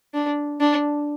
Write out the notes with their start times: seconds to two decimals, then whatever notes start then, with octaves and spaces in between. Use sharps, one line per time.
0.14 D4
0.60 D4